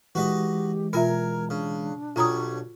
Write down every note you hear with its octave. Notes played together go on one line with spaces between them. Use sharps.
E3 G#3 F#4 G4 B4 D#5
B2 F4 A#4 E5 G#5 A#5
C#3 D4
B1 G3 F4 C#5 A#5 D#6